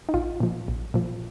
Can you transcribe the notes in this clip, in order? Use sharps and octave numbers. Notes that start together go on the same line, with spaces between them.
D#4
A#1 F4
A#2 F3
A#1
A#2 F3